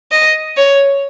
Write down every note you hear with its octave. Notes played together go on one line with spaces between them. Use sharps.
D#5
C#5